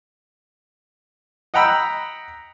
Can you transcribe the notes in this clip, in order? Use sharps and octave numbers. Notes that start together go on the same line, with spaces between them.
D#5 F#5 G5 A#5 B5 E6